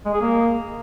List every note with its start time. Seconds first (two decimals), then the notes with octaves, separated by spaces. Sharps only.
0.05 G#3
0.13 G#4
0.21 A#3